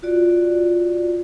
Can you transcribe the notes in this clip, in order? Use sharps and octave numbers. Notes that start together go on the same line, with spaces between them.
F4 F#4 D5